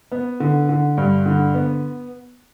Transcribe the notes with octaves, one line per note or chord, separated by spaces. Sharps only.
B3
D3
D3
G2
D3
B3